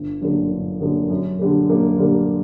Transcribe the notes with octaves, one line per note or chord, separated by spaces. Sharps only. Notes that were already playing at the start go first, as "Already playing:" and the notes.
Already playing: G1
F#2 D3 G3 A#3
G1
F#2 D3 G3 A#3
F#2
D3 G3 A#3
F#2 A#3
D3 G3 A#3